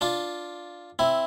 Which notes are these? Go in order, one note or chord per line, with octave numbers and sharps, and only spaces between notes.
D4 F4
C4 E4